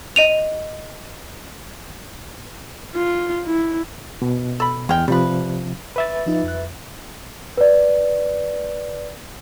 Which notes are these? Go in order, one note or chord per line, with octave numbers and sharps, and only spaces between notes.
D#5 D#7 F7
F4
E4
B2
A4 B5
E2 G#3 G5 F6
C3 F3 G3 B4
B4 E5 A6
F3 D#4 F4
F2 F#6
B4 D5